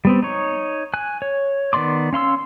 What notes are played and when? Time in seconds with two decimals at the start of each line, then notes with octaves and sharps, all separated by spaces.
0.05 G3 B3 C4
0.22 D#4 C#5
0.94 G#5 F#6
1.22 C#5
1.73 D#3 B3 D5 C6 D6
2.13 C#4 F5 C6 E6